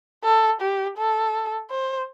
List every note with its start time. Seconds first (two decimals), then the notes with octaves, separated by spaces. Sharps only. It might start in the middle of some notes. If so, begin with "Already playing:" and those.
0.24 A4
0.61 G4
0.98 A4
1.70 C5